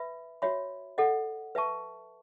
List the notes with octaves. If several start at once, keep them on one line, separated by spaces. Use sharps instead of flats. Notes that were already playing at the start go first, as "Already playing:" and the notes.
Already playing: B4 E5 B5
F#4 C#5 E5 B5
A4 D#5 F#5
B4 E5 A5 C#6